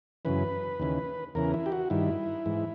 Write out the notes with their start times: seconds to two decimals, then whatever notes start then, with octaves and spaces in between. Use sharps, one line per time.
0.25 F#2 C#3 E3 B4
0.79 D#2 C#3 E3
1.35 E2 C#3 E3 A#4
1.54 E4
1.66 G4
1.72 F#4
1.90 G2 D#3 E4
2.46 G#2 E3